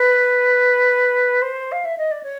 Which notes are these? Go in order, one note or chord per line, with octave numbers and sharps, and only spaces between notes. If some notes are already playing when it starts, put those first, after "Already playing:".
Already playing: B4
C5
F5
E5
D#5
D5
C#5